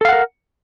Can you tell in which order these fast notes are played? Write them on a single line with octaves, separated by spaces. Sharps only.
A4 F5 F#5 A#4